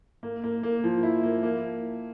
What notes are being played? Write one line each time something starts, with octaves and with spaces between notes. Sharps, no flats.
A#3
A#3
A#3
F3
E4
A#3
A#3